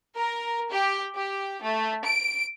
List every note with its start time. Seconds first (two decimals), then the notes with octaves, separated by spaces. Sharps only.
0.17 A#4
0.71 G4
1.15 G4
1.63 A3
2.05 D7